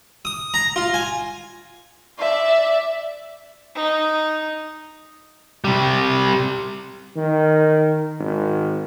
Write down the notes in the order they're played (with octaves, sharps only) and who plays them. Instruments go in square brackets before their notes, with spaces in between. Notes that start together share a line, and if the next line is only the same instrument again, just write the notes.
[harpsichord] D#6
A#5
F4
G#5
[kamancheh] D5 E5
[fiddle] D#4
[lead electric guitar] C3 G3
[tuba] D#3
G#1